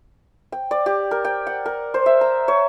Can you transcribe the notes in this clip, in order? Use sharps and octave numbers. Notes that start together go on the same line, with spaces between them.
G5
D5
G4
A#4
G5
F#5
A#4
C5
E5
A#5
C#5